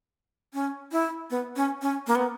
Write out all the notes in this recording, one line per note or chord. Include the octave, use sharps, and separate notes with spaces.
C#4
E4
B3
C#4
C#4
A#3
B3